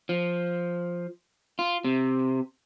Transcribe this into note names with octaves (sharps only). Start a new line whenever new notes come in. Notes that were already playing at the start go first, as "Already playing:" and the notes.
F3
F4
C3